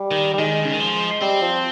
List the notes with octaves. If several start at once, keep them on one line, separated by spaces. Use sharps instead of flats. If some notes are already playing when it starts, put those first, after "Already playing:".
Already playing: G3
D#3
G3
D#3 G#3
C#3
D#3
F3
G3 C4
F3